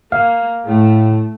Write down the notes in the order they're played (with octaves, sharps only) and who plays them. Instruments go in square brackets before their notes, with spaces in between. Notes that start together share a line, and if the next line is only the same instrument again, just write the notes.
[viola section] A#3 [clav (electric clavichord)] F5
[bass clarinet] A2 [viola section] A3